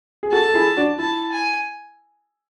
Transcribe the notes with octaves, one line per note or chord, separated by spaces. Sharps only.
G#4
F#4 A4 A5
A4
E4 G#4
D4 F#4
E4 A5
G#5